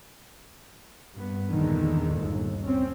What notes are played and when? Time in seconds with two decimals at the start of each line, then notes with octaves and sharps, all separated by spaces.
1.13 G2 B3
1.50 A#1 E2 A#2 D3 D#3 G#3
2.09 G1 D#2
2.63 C4 C#4